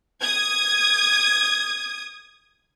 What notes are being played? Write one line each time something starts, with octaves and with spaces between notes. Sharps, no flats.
D#6 G#6